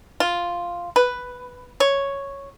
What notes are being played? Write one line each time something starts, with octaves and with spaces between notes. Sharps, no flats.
F4
B4
C#5